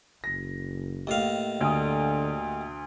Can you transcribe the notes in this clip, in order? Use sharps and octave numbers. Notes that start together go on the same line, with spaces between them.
F#1 A#6
D#2 A2 F5
D2 D3 D#6